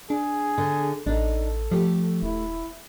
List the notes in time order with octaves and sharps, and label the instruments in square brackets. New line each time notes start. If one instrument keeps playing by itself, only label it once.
[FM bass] D4 [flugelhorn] G#4
[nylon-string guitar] D3
[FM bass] A1 [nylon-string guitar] D4 D#4 [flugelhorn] A4
[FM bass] F3 [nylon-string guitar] A3 G4
[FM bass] D#1 [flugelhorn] E4